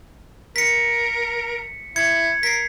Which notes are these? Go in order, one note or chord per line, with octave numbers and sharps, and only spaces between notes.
A#4 B6 C#7
E4 G#6 C#7
A#4 B6 C7